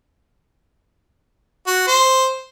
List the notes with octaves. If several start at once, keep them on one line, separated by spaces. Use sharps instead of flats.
F#4
C5